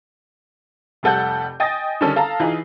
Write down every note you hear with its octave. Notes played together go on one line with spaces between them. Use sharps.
F1 G3 A4 F#5 G6
D#5 G5 G#5 D#6 A6 A#6
D3 D#3 G3 C#4 A4
A4 F5 A5 A#5
E3 D#4 F4 G#4